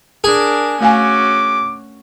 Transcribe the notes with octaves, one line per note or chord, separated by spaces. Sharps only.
D4 G#4 A#4
A3 C#4 F#4 F5 G#5 D6